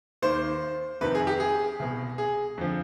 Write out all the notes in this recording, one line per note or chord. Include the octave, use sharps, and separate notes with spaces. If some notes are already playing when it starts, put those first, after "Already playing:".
D#2 D#3 C5
F2 C3 D#3 B4
G#4
G4
G#4
C2 B2
G#4
F2 D3 F3